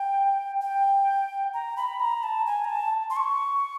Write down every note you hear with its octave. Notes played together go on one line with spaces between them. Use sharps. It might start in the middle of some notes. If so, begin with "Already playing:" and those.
Already playing: G5
G5
A#5
B5
A#5
A5
G#5
A#5
A5
C6
C#6